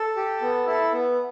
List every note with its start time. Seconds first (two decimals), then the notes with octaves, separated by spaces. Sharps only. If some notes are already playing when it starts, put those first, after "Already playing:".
Already playing: A4
0.16 G4
0.41 B3
0.67 E4 A4
0.92 B3